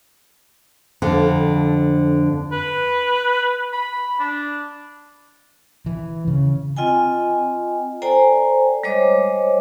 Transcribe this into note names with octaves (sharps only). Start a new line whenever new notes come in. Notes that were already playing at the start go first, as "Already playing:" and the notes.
F2 D3
B4
B5
D4
E3
C#3
C4 F4 D#5 G5 G#5
A4 C5 D5 G5 G#5 A#5
G3 G#3 C5 C#5 D#5 D6